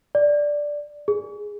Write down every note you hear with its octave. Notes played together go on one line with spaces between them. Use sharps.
D5
G#4